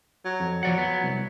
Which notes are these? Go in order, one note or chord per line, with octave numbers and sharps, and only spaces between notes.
F#3
F2
F3 F#3 D5 F#5
B3
C2